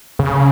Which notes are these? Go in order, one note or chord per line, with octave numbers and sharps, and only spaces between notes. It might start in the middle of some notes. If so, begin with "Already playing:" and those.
C#3